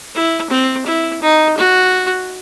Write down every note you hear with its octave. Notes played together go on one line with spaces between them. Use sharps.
E4
C4
E4
D#4
F#4